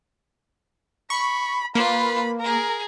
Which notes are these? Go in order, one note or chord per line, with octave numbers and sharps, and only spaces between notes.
B5 C#6
A#3 F4 B4 B5
G#4 A#4 A#5